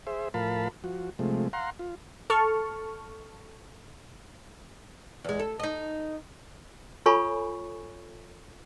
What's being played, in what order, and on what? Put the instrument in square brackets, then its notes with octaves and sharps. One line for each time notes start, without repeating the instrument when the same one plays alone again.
[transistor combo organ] G#4 C5 E5
A2 F3 A#4 F5 A5 B5
F3 F#4
C3 F3 G#3 A3
F5 F#5 A#5 C6
F4
[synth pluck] A4 A5 C#6 F6
[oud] E2 G#3
A4
D#4 D#5
[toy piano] F4 A4 C#5 G#5 B5 C#6